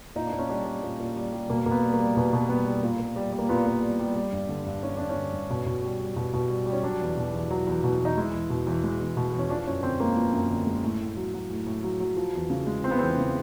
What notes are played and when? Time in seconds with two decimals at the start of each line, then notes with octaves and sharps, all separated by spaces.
0.16 A#2 D#4
0.27 D4
0.33 A#2
0.38 C#4
0.49 G3 D4
0.65 G3
0.83 A#2
1.00 A#2
1.16 G3
1.32 G3
1.50 B2 A#3
1.66 B2 A#3
1.71 B3
1.83 G3
1.94 A#3
1.99 G3
2.17 B2 B3
2.33 B2
2.49 G3 B3
2.66 G3
2.83 A#2
3.00 A#2
3.16 G3
3.33 G3
3.38 A#3
3.49 A#2 B3
3.67 A#2
3.83 G3
3.99 G3
4.16 G3
4.32 G2
4.49 D3
4.66 G2
4.83 G3 C#4
4.97 G2 D4
5.10 C#4
5.16 D3
5.33 G2
5.50 B2
5.66 B2
5.83 G3
6.00 G3
6.16 B2
6.33 B2
6.50 G3
6.66 G3
6.72 C#4
6.83 F#3 D4
7.00 E2
7.17 B2
7.33 E2
7.51 F#3
7.67 E2
7.84 B2
8.00 E2
8.05 D#4
8.17 G#3 E4
8.34 E2
8.50 B2
8.67 E2
8.84 G#3
9.00 E2
9.17 B2
9.34 E2
9.39 C#4
9.50 F3 D4
9.67 F#2 C#4
9.83 D3 C4
10.00 G#3 A#3
10.17 F3 B3
10.33 F#2
10.51 D3
10.67 G#3
10.84 A2
11.00 A2
11.17 F#3
11.34 F#3
11.50 A2
11.66 A2
11.84 F#3
12.00 F#3
12.17 F3
12.34 E2
12.50 C#3
12.67 G#3
12.83 F3 C4
12.91 B3
12.99 E2 C4
13.17 C#3